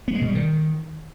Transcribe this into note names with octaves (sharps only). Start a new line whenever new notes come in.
B3
G#3
B2
G3
D#3